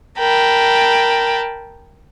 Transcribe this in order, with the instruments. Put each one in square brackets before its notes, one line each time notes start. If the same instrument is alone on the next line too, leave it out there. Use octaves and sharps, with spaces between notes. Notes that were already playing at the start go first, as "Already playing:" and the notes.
[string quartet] A#4 G5 A5 B5